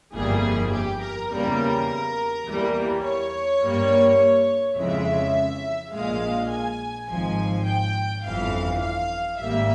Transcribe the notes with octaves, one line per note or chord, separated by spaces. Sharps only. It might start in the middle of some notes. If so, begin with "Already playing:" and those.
G1 F2 E3 G3 A#3 G#4
G4
A#4
E2 C#3 G3 A#3 A#4
E2 E3 G3 A#3
C#5
G2 G3 A#3
F2 C#3 E3 G#3 E5
A#1 A#2 G#3 F5
G#5
G#1 G#2 F3 G#5
G5
G1 F2 E3 F5
F5
G#1 G#2 G3 A#3 E5